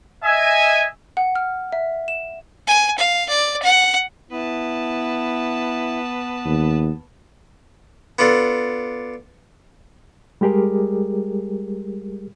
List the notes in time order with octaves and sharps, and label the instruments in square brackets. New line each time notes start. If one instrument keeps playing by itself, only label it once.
[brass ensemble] D#5 E5 G#5
[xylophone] F#5
F6
E5
E7
[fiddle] G#5
F5
D5
F#5
[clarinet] B3 [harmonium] E4 [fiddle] B4 A5
[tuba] D#2
[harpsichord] B3 D4 F4 A4
[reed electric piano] G3 G#3 G4 G#4 A#4